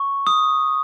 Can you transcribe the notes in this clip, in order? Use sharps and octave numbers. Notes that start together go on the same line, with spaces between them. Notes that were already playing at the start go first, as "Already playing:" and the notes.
Already playing: C#6
D#6